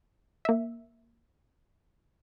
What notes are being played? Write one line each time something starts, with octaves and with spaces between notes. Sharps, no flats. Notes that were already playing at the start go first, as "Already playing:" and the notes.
A#3 E5